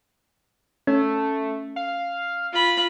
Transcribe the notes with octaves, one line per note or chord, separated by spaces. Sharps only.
A3 C#4
F5
F4 B5